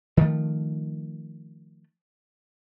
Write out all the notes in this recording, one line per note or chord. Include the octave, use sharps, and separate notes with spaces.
D#3 F3 A3